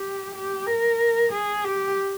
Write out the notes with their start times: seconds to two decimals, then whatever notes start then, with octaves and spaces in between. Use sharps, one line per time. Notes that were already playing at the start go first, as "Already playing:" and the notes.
Already playing: G4
0.35 G4
0.67 A#4
1.32 G#4
1.64 G4